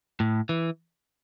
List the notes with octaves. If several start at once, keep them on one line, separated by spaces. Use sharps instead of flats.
A2
E3